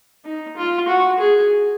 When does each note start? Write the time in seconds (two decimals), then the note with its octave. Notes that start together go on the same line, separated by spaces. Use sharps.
0.25 D#4
0.57 F4
0.88 F#4
1.19 G#4